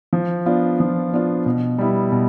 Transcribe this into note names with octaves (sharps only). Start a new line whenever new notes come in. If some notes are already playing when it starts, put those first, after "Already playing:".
F3
B3 D4 F4
F3
B3 D4 F4
B2
G3 B3 E4
B2